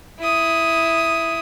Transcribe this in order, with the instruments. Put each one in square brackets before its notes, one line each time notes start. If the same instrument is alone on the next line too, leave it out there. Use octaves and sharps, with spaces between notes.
[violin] E4 D#6